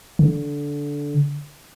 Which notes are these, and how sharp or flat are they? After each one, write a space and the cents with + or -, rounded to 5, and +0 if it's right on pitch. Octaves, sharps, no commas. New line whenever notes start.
D3 -15